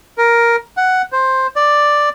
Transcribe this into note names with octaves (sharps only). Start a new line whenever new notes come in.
A#4
F#5
C5
D5